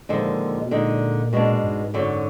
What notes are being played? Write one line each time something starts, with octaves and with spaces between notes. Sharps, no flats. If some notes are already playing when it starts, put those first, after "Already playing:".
D#2 A#2 D3 F3 G#3
B2
A#2 D3 G#3 D#4
B2 G#3 B3 D4
G#2
F#2 D3 F#3